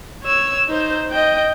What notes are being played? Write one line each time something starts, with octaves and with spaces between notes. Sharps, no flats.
C#5 E6
D#4 C5
D#5 G5